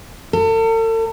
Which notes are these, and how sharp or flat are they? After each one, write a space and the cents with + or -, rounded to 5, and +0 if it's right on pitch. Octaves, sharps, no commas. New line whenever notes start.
A4 +40